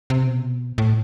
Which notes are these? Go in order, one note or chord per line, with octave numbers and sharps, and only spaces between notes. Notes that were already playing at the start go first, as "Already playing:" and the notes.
C3
B2
A2